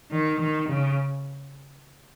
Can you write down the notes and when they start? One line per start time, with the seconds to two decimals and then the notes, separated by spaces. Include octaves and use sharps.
0.11 D#3
0.40 D#3
0.69 C#3